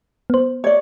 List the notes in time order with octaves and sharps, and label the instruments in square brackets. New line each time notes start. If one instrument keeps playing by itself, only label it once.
[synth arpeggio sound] B3 C5
[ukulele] C#5 D5